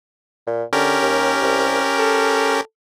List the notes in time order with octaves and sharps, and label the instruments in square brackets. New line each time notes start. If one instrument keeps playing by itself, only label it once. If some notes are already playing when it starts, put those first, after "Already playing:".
[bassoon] A#2
[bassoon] D3 [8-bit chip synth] C#4 G4 A#4
[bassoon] D#2
C2
A4